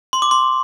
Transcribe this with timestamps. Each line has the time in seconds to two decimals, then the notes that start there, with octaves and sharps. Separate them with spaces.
0.13 C6
0.22 D6
0.31 C6